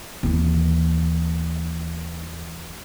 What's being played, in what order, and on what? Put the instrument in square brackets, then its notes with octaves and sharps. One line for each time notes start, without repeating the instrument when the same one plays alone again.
[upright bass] D#2 E3